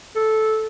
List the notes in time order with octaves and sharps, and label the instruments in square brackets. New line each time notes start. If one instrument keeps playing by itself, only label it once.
[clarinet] A4